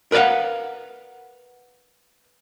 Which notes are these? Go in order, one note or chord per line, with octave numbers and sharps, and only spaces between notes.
A#4 B4 D5 F5 F#5